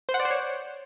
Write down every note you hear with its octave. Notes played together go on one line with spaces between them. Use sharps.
C5
F#5
D5
C5
C#5